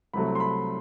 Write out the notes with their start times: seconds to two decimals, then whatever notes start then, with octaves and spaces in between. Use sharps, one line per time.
0.14 C2 C3 F#3 A3 B5
0.35 C6
0.40 B5